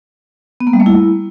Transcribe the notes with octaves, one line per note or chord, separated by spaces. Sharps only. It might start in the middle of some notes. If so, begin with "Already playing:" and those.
B3
A#3
G3
A3
E4